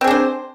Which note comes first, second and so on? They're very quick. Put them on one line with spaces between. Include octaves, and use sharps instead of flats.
C4 G#4 D4 C5